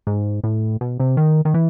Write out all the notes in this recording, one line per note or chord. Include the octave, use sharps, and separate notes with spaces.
G#2
A2
B2
C3
D#3
D#3
E3